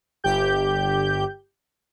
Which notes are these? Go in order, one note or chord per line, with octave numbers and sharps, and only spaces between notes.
G1 G4 G6